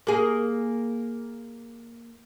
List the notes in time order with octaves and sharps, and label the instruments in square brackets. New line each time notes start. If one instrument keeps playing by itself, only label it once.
[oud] A#3 G#4